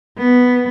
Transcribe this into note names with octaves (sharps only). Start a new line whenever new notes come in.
B3